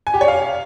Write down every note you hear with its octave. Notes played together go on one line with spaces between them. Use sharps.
G#5
G4
C#5
F5